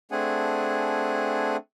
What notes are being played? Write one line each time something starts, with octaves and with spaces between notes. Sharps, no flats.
A3 C4 D4 G#4 F#5 G#5